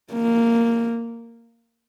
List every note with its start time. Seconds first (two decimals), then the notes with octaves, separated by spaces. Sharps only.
0.12 A#3